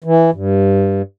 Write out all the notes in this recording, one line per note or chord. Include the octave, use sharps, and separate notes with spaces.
E3
G2